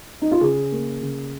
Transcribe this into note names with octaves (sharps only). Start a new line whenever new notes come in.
D#4
F4
C#3 G#4
A#3
C#3